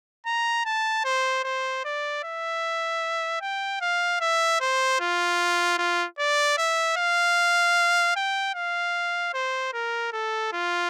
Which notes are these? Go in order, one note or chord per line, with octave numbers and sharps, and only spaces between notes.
A#5
A5
C5
C5
D5
E5
G5
F5
E5
C5
F4
F4
D5
E5
F5
G5
F5
C5
A#4
A4
F4